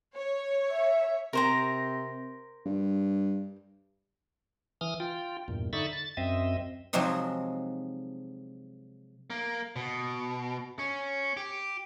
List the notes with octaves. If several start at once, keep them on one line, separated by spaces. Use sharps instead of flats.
C#5
E5
C3 A#4 C5 A#5
G2
E3 D#6 F6
F4 G5
E2 G2 A#2
D3 D#4 E5 B5 C#6 A6
A6
F#2 C4 D#5 E5
C3 F3 F#3 G#3 C4 D#4
A#3
B2
C#4
G4